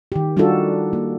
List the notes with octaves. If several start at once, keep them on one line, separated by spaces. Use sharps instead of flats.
D#3 G4
G3 D4 D#4 F4 F#4 A4
A#3